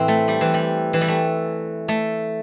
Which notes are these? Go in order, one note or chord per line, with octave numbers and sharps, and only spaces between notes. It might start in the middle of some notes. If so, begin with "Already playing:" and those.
Already playing: A2 E3 C4
A3
G3
E3
G3
E3
G3
A3
A3